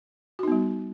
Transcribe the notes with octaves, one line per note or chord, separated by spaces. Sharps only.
G3 B3 D#4 F#4